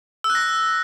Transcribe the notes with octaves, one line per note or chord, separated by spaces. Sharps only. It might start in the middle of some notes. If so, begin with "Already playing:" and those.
E6
F#6
A#6